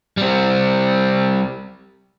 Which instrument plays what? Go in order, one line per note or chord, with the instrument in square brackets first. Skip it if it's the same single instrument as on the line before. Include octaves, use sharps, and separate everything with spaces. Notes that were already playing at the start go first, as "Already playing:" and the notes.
[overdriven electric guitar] G3 C4